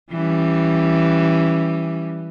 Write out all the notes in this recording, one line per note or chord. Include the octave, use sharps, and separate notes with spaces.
E3 G3 C#4